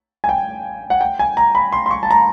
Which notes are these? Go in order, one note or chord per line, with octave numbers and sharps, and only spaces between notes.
G#5
G5
F#5
G5
G#5
A#5
B5
C6
C6
C#6
A5
A#5